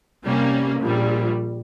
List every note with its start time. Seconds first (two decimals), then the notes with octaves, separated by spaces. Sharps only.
0.24 C3 G3 A#3 C#4
0.81 A#1 A#2 G3